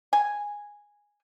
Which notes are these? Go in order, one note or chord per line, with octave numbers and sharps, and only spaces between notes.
G#5